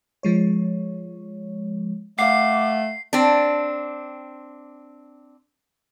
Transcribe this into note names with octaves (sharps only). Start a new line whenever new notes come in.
F3 G#3 C#5
A3 F5 F#5 D6 C7
C4 D4